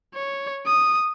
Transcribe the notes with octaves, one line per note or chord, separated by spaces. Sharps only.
C#5
D#6